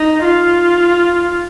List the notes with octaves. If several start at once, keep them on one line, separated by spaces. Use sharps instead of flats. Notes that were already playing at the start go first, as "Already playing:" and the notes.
Already playing: D#4
F4